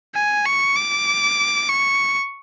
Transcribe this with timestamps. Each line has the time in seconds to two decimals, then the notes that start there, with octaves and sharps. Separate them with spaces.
0.15 G#5
0.45 C#6
0.76 D6
1.68 C#6